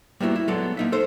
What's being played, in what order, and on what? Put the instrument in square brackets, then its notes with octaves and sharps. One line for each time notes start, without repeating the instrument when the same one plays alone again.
[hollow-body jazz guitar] G3 A#3 B3 E4 F#4
E4
F#3 G#3 B3 A4 D5 F#5
A#3 D#4 E5
A4 C5